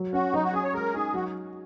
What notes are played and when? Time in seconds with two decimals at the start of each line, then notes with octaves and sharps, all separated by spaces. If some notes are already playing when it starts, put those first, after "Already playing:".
Already playing: F#3
0.13 C#4 F#4
0.33 F#3 D#4
0.43 F#4
0.53 C#4 G#4
0.63 C#5
0.74 G#3 A#4
0.94 D#4 G#4
1.14 F#3 F#4